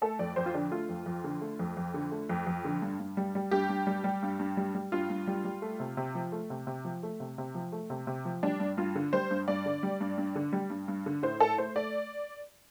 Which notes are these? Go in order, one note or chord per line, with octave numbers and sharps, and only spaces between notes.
A3 A4
F2 D5
F2 C5
F4
D3 D4
A3 F4
F2
F2
D3
A3
F2
F2
D3
A3
F2
F2
D3
G2
G2
G3
G3
G2 G4
G2
G3
G3
G2
G2
G3
G3
G2 F4
G2
G3
G3
A3
C3
C3
F3
A3
C3
C3
F3
A3
C3
C3
F3
A3
C3
C3
F3
G3 D4
G2
G2 F4
D3
G3 C5
G2
G2 D5
D3
G3
G2
G2
D3
G3
G2
G2
D3
A2 C5
A2 A4
A3 C5
A3 D5